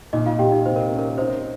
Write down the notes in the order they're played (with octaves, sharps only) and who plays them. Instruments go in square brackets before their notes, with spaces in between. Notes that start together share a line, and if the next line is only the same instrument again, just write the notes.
[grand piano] A#2 [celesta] D#4 D#5
[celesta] F4 F5
[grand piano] A#2 [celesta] G4 G5
[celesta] D#4 D#5
[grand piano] C3 [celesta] C5
[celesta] A#4
[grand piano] C#4
[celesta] A#4
[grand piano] D#4 [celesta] C5